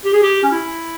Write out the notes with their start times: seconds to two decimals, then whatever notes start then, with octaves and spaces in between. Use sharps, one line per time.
0.05 G4
0.14 G#4
0.22 G4
0.43 C#4
0.51 E4